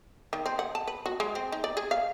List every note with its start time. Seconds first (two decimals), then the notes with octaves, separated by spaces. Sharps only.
0.33 D#3
0.46 C4
0.59 F#5
0.75 A5
0.87 B4
1.06 F#4
1.20 G#3
1.35 C4
1.52 D#4
1.64 D5
1.77 G#4
1.91 F5